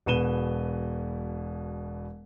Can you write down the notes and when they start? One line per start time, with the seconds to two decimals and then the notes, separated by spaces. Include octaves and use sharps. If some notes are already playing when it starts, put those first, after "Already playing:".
0.06 E1 B2 B4 D#7 E7 G7